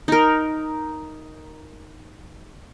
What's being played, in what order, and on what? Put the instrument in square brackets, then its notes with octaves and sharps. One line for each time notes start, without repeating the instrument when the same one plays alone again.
[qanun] D#4 A#4